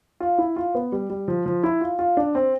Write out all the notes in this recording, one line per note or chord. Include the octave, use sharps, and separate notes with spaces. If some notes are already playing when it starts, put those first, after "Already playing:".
F4
E4
F4
B3
G3
G3
F3
F3
E4
F4
F4
D4
C4